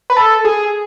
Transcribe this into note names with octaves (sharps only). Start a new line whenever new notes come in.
B4
A4
G#4